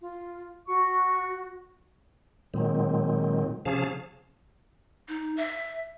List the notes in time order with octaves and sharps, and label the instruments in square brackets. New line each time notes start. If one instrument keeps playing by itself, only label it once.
[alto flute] F4
[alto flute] F#4 [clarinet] C#6
[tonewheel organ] A#2 D#3 F#3 G#3 C4
C3 F3 C#4 G#4 F5 A5
[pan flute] D#4
E5